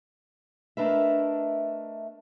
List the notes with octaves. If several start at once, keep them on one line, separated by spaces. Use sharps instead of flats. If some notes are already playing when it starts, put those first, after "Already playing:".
A3 D4 A#4 B4 D#5 E5